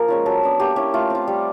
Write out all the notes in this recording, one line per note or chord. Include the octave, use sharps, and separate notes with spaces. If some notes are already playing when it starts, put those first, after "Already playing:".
Already playing: F3 A#3 A#4
G#3 C#4 F4
F#3 A4
B3 D4
A#3 G4
C#4 E4 G4
A3 F4
C4 F4
G3